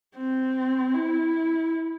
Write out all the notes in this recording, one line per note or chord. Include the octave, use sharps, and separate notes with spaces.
C4
E4